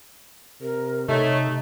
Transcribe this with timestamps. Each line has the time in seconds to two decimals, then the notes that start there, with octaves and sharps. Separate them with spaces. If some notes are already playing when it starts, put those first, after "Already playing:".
0.61 C3 A#4
1.09 C3 A3 D#4 C#5